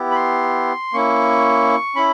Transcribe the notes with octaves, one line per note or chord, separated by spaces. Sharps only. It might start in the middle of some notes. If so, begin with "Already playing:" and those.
Already playing: B3 E4 G4
B5
C6
A#3 C#4 E4 C#6
C#4 E4 B5